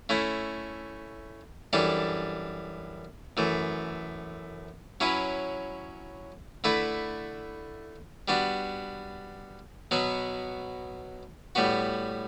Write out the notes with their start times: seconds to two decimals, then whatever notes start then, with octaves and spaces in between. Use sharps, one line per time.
0.09 A3 C#4 E4
1.73 F#2 E3 G3 D4 A4
3.37 F#2 E3 A3
5.00 F#3 C#4 E4 B4
6.64 D3 A3 E4 B4 E5
8.28 G3 B3 D4 F#4
9.91 B2 F#3 B3 F#4
11.55 A2 G3 B3 F#4